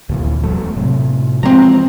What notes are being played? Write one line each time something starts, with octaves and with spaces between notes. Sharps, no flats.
D2 A#2 E3
E1 F#3 A3
A2 C3
E3 F3 G#3 C4 A#5